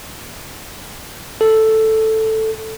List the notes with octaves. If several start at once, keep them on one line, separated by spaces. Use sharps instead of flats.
A4